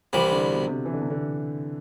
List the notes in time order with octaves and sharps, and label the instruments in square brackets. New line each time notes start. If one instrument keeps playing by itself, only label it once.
[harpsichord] C2 C3 E3 G3
[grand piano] D3
B2
C3
E3
D3
C3
D3